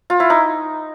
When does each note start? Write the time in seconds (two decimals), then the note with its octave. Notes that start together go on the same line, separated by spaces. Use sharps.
0.10 F4
0.20 E4
0.30 D#4